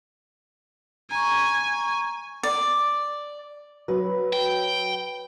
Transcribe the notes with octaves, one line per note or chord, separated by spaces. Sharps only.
G#5 A#5 C#6
D5
F#3 B4
G5